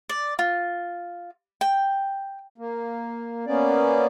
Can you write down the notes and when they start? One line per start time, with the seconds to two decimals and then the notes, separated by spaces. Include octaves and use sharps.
0.09 D5
0.39 F4
1.61 G5
2.58 A#3
3.47 A#3 B3 C#4 D5